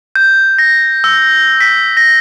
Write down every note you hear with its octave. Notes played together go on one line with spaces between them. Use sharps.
G6
A#6
E6
B6
A#6